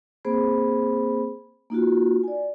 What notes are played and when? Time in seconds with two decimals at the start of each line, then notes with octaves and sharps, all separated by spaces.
0.25 A#3 C4 G#4 C5 B5
1.70 A#3 D#4 F4 F#4
2.23 D5 G#5